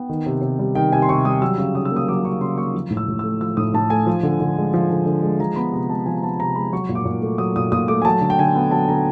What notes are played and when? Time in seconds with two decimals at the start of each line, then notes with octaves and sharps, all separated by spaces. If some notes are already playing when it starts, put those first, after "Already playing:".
Already playing: B3 G5
0.09 D#3
0.26 C3
0.42 C3
0.59 G3
0.75 D#3 G5
0.92 C3 G#5
1.02 C6
1.09 C3 C#6
1.25 G3 D#6
1.41 F#3 E6
1.58 C#3
1.75 C#3 D#6
1.85 E6
1.92 A#3 D#6
2.08 F#3 D6
2.24 C#3 C#6
2.41 C#3 C6
2.58 A#3 C#6
2.74 F3
2.90 A2
2.97 E6
3.08 A2
3.19 A3 E6
3.41 F3 E6
3.57 A2 D#6
3.74 A2 A5
3.90 A3 G#5
4.07 F3
4.23 D3
4.40 D3
4.57 G#3
4.74 F3
4.90 D3
5.06 D3
5.23 G#3
5.40 F3 A#5
5.56 B3 B5
5.73 C3 A#5
5.90 G#3 A5
6.06 F3 G#5
6.17 A#5
6.23 B3 A5
6.39 C3 A#5
6.55 G#3 B5
6.72 F#3 C#6
6.89 A#2
6.95 D6
7.05 A#2
7.22 A3
7.38 F#3 D#6
7.56 A#2 D#6
7.72 A#2 D#6
7.88 A3 D6
8.02 G#5
8.05 F#3 A5
8.21 D3
8.30 G5
8.39 D3 G#5
8.56 B3
8.71 F#3 A5
8.88 D3 A#5